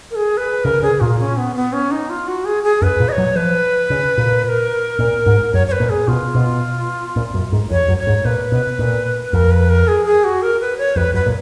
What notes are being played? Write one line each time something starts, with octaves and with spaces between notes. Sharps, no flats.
A#4
G#4
B4
C#3 A#4
C#3 G#4
A#2 F4
C#4
B3
B3
C#4
D#4
F4
F#4
G#4
G#4
F#2 B4
A#2
D#5
C#5
F#3
F3 B4
C#3
A#2
B4
A#4
A#2
G#2
F#2 C#5
C#5
B4
A#2
G#4
B2 F4
B2
A#2
F#2
G#2
F2 C#5
F#2
C#5
G#2
A#2 B4
B2
A#2
F2 A#4
B4
A#4
G#4
G#4
F#4
A#4
B4
C#5
F2 B4
F#2 B4
A#2